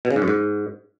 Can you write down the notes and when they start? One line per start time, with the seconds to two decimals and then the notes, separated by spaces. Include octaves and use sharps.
0.05 B2
0.11 C#3
0.16 G#2
0.22 F#2
0.28 G#2